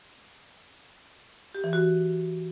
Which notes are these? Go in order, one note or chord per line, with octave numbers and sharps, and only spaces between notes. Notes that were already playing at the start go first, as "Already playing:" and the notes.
G4
E3
F#4